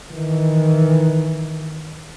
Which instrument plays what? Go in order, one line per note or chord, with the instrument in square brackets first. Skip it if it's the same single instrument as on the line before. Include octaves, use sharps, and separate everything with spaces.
[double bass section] D#3 E3